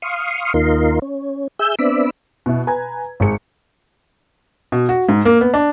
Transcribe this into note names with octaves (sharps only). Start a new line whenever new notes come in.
F5 C6 C#6 D#6
D#2 A#3 D#4 F4 A#4 C6
C#4
G#4 E5 E6 G6
B3 C4 D4 D5 E5 B5
B2 E4
B4 G#5 A#5 G#6
G#1 G#4 C#7
B2
F#4
G#2
A#3
B3
D4